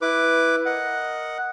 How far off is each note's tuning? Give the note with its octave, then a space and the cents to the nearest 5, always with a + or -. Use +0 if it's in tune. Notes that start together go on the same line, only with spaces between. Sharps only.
E4 +0 B4 +0 D6 +0
A#4 +0 D#5 +0 F#5 +0